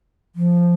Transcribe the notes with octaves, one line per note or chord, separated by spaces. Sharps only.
F3